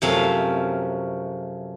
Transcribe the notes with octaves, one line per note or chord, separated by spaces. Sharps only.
F#2 C3 F3 A3 C#4 F5